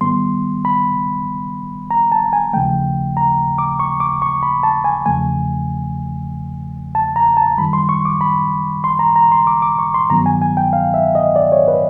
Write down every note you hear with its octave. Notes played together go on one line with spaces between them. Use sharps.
G#2 D#3 G3 B3 C6
B5
A#5
A5
G#5
D#2 C#3 F3 A3 G5
A#5
D6
C#6
D6
C#6
B5
A5
G#5
E2 C#3 F3 A3 G#5
A5
A#5
A5
F#2 D#3 G3 B5
C6
C#6
D6
B5
C6
A#5
A#5
C6
D6
D6
C#6
C6
G2 D#3 F#3 B3 A#5
G#5
G#5
G5
F5
E5
D#5
D5
C#5
B4